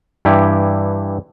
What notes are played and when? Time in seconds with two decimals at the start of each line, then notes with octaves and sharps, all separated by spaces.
0.25 G2 E3 E4 G4